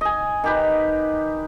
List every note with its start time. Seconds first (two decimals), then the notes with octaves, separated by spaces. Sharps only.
0.01 D#5 G#5
0.44 D#3 G4 B4